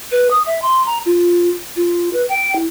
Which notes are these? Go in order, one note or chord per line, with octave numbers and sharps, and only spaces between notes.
B4
D#6
E5
C6
A#5
F4
F4
B4
G5
E4